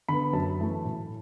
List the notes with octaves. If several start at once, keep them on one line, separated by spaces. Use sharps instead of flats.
D3 B3 B5
F#2 A5
E3 A3
A2